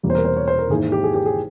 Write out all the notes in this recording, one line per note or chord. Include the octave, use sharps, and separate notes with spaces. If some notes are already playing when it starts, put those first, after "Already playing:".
E1 E2 C3 G3 A#3
C5
A#4
C5
C#5
C5
A#4
G#1 G#2 E3 A#3 G#4
G4
G#4
G4
G#4